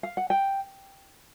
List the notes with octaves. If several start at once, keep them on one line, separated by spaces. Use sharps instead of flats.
F5
F#5
G5